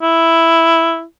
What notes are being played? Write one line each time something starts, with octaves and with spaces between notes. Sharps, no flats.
E4